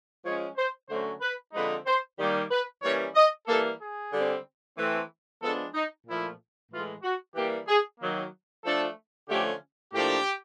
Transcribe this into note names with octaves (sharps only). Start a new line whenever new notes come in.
F3 G#3 C#4 C#5
C5
D3 F#3 A3 C#4 C5
B4
D3 F3 G#3 C4 D#4 B4
C5
D#3 G3 A#3
B4
E3 G3 A#3 C#4 C#5
D#5
E3 G3 A#3 A4
G#4
D3 G3 C4
E3 A3 C4
F3 G#3 B3 D4 A4
D#4
A#2 F3 A3 E4
A2 E3 G#3 F4
F#4
E3 G3 A#3 G4
G#4
D#3 F#3 A#3
F3 A3 D4 A4
D3 F3 A3 C#4 G4
A2 F3 A#3 D4 G4